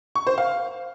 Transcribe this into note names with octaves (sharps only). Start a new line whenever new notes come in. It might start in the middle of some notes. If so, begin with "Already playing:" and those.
C#6
C5
F5